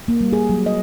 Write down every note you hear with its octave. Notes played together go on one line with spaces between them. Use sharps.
A#3
G3
G#4
F#3
D#5